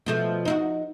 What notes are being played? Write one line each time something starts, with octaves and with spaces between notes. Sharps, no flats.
B2 F3 A3
D#4 E4 F#4